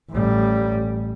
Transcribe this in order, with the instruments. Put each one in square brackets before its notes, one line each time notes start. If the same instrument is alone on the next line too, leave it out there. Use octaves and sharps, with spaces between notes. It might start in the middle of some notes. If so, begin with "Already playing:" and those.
[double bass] A1 G3